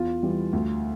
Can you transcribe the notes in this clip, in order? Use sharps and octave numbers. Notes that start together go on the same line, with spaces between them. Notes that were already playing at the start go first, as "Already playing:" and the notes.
Already playing: E2 F4
E3 G3
D2